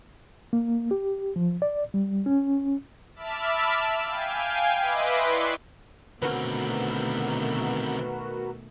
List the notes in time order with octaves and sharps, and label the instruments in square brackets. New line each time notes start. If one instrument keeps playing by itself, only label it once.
[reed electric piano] A#3
G4
F3
D5
G3
C#4
[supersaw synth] E5 A5 B5 D6 E6 F6
F5 G5 G#5
B4 D#5 E5 B5 C6 D6
E4 B4 D5 C6 C#6
[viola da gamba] B2 D#3 A3 [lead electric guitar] D3 C4 [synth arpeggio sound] F#4 A#4 B4